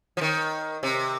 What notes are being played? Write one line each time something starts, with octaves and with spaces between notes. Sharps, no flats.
F3
D#3
C3